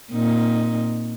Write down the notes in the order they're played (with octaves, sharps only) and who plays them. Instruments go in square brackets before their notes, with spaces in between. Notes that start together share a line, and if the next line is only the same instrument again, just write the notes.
[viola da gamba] A#2 C4 D#4